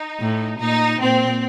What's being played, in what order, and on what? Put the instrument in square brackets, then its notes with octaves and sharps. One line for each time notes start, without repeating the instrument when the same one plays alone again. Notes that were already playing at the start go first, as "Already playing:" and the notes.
Already playing: [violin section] D#4
[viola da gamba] A2
[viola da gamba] A#2 [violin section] D#4
[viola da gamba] A#2 [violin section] C4